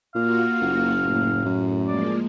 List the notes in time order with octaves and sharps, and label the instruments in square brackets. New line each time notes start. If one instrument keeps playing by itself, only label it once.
[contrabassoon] A#2 [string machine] A#3 F4 F#4 [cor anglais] F5
[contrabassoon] F#1
[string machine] A2
[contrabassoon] F#2
[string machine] F3 G#3 A#3 [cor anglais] D5